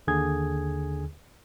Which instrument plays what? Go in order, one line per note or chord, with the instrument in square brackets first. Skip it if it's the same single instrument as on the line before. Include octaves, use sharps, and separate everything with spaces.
[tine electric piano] D#2 D3 G#4 G#6